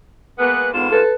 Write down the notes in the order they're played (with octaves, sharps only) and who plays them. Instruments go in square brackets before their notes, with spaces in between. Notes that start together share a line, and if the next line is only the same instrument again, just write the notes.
[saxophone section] G#3 A#3 B3 [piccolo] F#6
[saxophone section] G#2 D3 F4 [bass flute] B3 [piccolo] E7
[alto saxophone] A4 [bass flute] B4